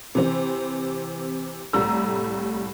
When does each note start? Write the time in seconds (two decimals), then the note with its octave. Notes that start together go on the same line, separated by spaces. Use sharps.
0.15 C3 E3 C4
1.73 C2 A2 G3 A3 A#5 E6